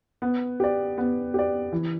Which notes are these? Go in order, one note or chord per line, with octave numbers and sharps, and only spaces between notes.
B3
G4 D5
B3
G4 D5
E3